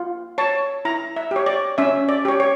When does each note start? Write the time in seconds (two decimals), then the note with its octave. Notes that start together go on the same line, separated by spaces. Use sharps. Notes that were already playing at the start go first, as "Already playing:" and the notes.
Already playing: F4
0.38 C#5 A5
0.85 E4 A#5
1.16 E5
1.31 G4 C#5
1.46 D5
1.78 C#4 E5
2.09 D5
2.25 G4 C#5
2.40 C#5